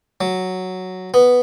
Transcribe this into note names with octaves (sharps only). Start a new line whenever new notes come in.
F#3
B3